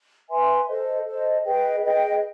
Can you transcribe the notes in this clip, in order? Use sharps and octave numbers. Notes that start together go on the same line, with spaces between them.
B4 E5 G#5 C6
A4 C5 D#5
A4 C5 D#5
G#4 B4 D#5 G5
G#4 B4 D#5 G5